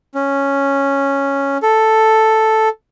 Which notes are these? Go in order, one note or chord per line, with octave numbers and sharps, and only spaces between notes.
C#4
A4